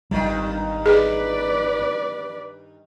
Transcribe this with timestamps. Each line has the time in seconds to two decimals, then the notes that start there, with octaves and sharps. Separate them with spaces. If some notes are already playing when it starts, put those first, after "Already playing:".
0.11 G#1 G2 D#3 G3
0.86 G#4 B4 D5